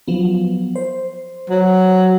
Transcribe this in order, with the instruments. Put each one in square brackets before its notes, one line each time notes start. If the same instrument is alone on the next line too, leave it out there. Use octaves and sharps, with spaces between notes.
[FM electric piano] F3 F#3 B3
C5
[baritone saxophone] F#3